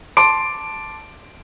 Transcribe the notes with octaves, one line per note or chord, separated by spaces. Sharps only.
A5 C6 D6 D7